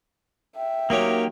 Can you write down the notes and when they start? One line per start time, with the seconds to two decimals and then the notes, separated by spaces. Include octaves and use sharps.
0.57 E5 G5
0.90 D#3 F#3 A#3 C#4 D#4 G4